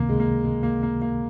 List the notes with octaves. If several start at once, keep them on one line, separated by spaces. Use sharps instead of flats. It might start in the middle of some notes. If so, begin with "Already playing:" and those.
Already playing: C#2 C3 D#3 A#3
G#3
A#3
G#3
A#3
A#3
A#3